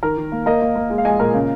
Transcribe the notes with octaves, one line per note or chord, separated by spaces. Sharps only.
D#3 A#4
D#3
A#3
A#3 A#4 D#5
A#3
A#3
G#3
F5
G#3 D#5 G#5
A#2 A#4
C#3